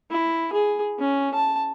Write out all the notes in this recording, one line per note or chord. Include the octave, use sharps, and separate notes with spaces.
E4
G#4
C#4
A5